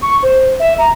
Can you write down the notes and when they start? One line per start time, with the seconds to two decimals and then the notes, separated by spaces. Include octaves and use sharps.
0.02 C#6
0.23 C5
0.60 E5
0.78 A#5